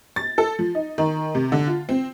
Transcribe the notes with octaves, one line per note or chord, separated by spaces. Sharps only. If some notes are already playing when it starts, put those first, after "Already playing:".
A6
A4
F3
D#4
D#3
C3
D3
F4
C4